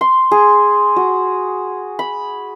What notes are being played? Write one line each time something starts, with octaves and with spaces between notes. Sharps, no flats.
C6
G#4
F#4
B5